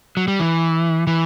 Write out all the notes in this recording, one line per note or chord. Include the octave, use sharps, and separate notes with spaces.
F#3
G3
E3
E3